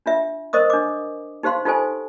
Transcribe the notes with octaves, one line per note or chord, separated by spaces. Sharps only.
D4 F4 E5
A#4 C5 D#5 C#6 D#6
D4 D6
D#4 G4 C5 F5 C6
D#4 F4 G4 A4 C5 G#5